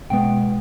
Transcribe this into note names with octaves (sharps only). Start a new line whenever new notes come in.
B2 G#3 B3 G5